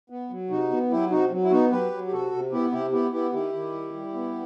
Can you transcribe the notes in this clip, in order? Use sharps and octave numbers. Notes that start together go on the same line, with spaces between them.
B3
F#3
C3 D#4 F#4
B3
F#3 E4 G4
C3 D#4 F#4
F#3
E4
B3 D#4 F#4
F#3 G4 B4
F#3
G4
C3 F#4 A4
C3
B3 E4 G4
C3 E4 G4
B3 E4 G4
B3 E4 G4
D#3 E4 G4
D#3
G3
G3
B3